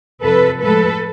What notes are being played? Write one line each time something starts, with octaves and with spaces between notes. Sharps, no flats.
F2 C3 F3 A4 B4
A2 F3 G#3 A4 B4